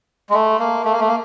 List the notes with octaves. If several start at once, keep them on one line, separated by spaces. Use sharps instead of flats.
G#3
A3
A#3
A3
A#3
A3
A#3